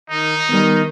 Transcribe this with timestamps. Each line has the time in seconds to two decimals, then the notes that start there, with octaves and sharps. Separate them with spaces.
0.10 D#3 D#4
0.49 D#3 G3 B3